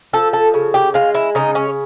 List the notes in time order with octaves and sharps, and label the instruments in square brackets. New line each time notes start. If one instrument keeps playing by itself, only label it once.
[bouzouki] F3 A4
A4
C#3
G4
G#3 F4
E4
C#3 D#4
C#4